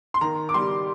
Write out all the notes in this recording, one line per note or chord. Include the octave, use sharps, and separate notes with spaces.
C6
D#3 A#5
D6
G3 C6